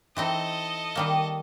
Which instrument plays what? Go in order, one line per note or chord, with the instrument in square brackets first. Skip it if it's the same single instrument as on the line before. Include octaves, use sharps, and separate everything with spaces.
[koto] E3 C4 D#4 [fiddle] A4 D#5
[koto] D#3 G3 A#3